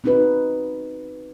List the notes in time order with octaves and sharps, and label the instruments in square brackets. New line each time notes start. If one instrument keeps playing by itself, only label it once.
[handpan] B3 C4 D#4 F#4 B4